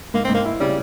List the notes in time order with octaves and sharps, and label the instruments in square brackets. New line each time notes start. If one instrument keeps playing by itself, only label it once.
[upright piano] G#2 [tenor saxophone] A#3
[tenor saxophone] C4
[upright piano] G#2 [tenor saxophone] A#3
[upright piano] E4
[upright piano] C#3 [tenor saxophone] G3